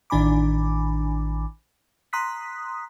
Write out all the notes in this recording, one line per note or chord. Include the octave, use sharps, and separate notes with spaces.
A1 D#3 D4 G#5 B5 D6
A#5 C6 D#6 F#6 B6